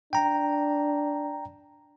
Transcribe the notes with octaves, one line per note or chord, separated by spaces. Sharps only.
D4 G5 A#5